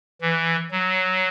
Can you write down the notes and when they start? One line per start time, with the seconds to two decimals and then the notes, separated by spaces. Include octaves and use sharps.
0.21 E3
0.71 F#3